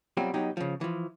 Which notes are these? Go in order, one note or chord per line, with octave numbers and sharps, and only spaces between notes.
B2 F#3 G3 C4 F4
B2 F#3 D#4 G4
C#3 F3
E3 F3